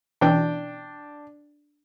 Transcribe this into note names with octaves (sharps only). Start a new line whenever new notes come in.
B2 E3 D4 G5